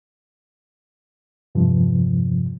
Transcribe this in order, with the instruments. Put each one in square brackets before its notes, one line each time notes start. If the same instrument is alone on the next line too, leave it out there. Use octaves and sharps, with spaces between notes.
[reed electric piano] E2 G2 C3 F3